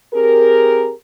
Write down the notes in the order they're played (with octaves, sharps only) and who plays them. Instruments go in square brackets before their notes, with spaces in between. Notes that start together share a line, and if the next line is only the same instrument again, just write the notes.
[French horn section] C4 G4 G#4 A#4